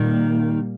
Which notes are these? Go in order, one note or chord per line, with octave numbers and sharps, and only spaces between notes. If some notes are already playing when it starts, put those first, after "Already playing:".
Already playing: A#2 D#3 G3 A#3